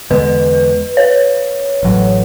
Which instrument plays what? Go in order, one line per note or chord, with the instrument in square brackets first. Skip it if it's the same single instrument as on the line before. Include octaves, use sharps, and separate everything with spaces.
[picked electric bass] E2 D3 G#3 B3 [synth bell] B4
[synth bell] C#5
[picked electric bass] A1 A2 F#3